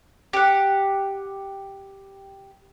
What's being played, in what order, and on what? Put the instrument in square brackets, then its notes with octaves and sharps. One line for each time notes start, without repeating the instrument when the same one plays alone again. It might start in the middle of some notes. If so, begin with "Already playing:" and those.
[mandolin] G4 F#5